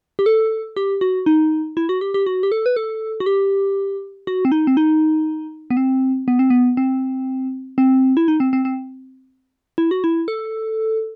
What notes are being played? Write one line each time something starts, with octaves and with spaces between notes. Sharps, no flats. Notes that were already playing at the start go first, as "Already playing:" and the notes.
G4
A4
G4
F#4
D#4
E4
F#4
G4
G4
F#4
G4
A4
B4
A4
F#4
G4
F#4
C4
D#4
C4
D#4
B3
C4
B3
C4
B3
C4
C4
E4
D#4
C4
C4
C4
E4
F#4
E4
A4